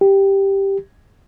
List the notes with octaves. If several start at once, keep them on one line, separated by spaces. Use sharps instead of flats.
G4